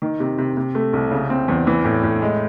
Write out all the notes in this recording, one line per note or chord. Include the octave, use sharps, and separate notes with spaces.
D#3
C3
C3
C3
A3
C2
C#3
C4
E2
E3
A2
A2
G#3